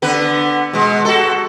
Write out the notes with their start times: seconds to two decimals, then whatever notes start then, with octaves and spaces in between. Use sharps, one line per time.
0.02 D3 B3 B4
0.73 B2 G#3
1.05 F#4 A4